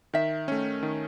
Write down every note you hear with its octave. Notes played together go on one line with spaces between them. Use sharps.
D#3 E5
A3 C#4
D#3